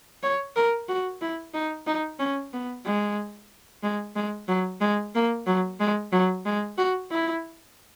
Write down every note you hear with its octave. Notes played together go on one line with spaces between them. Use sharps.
C#5
A#4
F#4
E4
D#4
D#4
C#4
B3
G#3
G#3
G#3
F#3
G#3
A#3
F#3
G#3
F#3
G#3
F#4
E4